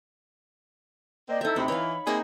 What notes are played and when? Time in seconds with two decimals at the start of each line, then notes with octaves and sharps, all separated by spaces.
1.28 A#3 C4 D5 D#5
1.41 D#4 E4 A4 E5 G6
1.56 D2 C3 C4 B5
1.68 E3 C#5 F5
2.07 A#3 C4 D#4 G#4 E5